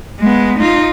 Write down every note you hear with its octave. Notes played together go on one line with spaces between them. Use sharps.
G#3 B3
D#4 F4